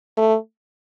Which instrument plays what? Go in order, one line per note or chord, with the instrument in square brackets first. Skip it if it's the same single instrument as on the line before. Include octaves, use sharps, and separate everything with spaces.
[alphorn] A3